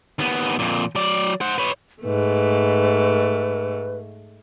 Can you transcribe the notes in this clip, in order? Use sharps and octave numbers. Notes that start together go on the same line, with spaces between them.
D#2 B3
F2 A#2
F#3 D5
C5 F#5
B4 C#5
G#2 A3 B4